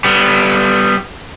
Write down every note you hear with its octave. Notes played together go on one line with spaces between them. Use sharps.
G3 B3